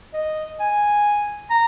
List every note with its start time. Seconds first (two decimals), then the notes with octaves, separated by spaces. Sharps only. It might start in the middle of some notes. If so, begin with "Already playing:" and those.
0.14 D#5
0.60 G#5
1.50 A#5